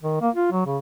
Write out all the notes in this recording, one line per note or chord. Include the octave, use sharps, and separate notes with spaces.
D#3
A#3
F4
F#3
C#3